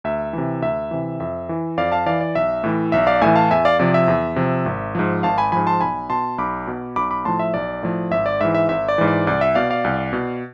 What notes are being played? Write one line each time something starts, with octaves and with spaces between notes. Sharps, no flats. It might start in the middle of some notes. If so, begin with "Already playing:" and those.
D2 E5
C3 E3
D2 E5
C3 E3
F2 E5
E3
F2 D5 F5
F5 A5
E3 D5 F5
D5
B1 E5
A2 E3
B1 E5
D5 F5
A2 E3 E5 G#5
F5 A5
E2 E5 G#5
D5 F5
C3 F3 D5
E5
E2
C3 F3
G#1
G#2 F3
G#1 F5 A5
G#5 B5
G#2 F3 G#5 B5
A5 C6
B1 G#5 B5
B2 A5 C6
B1 B5 D6
B2
B1 B5 D6
B5 D6
A2 F3 A5 C6
E5
B1 D5
A2 F3
G#1 E5
D5
G#2 E3 E5
E5
G#1 E5
D5
G#2 E3
D5
C2 D5
E5
B2 D5 F5
D5 F5
C2
B2